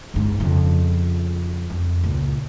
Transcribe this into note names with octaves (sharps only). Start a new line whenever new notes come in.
G1 G#2
F2 C#3
F2
C#2 A#2